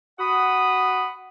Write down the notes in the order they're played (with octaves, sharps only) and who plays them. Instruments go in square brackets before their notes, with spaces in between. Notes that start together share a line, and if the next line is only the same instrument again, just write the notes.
[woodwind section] F#4 F#5 B5 D#6